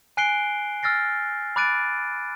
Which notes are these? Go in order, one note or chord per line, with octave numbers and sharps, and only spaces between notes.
G#5 F#6 C7 D7 G7
E6 F6 A6 A#6 C7
B5 D6 F#6 A6 D7 D#7